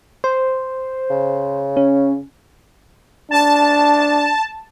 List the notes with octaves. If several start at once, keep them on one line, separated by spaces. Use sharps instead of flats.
C5
C#3
C#4
D4 A5